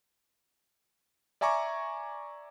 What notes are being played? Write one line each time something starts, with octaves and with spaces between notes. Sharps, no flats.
D5 E5 G#5 A#5 C#6 D6